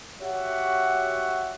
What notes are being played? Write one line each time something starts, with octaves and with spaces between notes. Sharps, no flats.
F#4 G4 C#5 E5 F#5